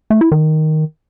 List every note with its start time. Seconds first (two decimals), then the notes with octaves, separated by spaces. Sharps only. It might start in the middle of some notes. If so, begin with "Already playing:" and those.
0.10 A3
0.21 E4
0.32 D#3